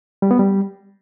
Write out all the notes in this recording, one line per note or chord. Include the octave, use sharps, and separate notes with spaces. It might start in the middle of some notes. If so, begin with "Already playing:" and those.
G3
B3
G3